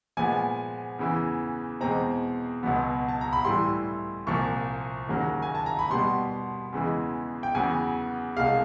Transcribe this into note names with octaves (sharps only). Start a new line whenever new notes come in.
A#2 F3 G#3 B3 G#5
E2 C#3 E3
E2 B2 G#3 C4 A#5
C#2 B2 F#3 B3
A5
A#5
B5
A2 E3 G3 C6
C2 A#2 F3 A#3 C#6
D#2 C#3 F#3 A#3
G#5
A5
A#5
B5
B2 G3 B3 C6
E2 C#3 E3 G#3
G5
E2 C#3 F#3 B3 G#5
C2 B2 G#3 F5